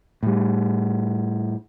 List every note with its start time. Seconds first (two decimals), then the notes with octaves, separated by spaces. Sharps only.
0.23 A2 G3